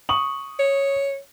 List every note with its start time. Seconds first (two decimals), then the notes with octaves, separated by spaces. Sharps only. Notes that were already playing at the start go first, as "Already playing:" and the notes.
0.09 C#6 D#6 F#7
0.59 C#5